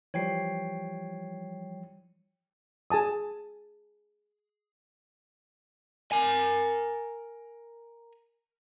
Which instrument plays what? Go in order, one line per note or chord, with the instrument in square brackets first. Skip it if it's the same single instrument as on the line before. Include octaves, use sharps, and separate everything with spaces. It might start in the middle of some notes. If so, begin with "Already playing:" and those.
[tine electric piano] E3 F3 G3 [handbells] C#5 G5 C7
[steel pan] G#4 G#5 A5 D#6
[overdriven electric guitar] A#4 G#5